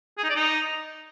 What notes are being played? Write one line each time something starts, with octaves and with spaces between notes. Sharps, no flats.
G#4
D#4
D5
D#4